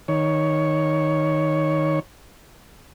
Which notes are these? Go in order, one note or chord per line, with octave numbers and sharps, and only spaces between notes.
D#3 C#5